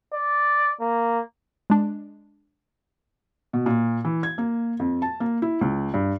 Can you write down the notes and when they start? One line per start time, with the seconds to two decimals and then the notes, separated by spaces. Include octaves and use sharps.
0.14 D5
0.81 A#3
1.70 G#3 D4
3.53 B2
3.66 A#2
4.05 E3
4.23 G#6
4.38 A#3
4.80 F2
5.02 A5
5.20 A#3
5.42 E4
5.61 C#2
5.94 G2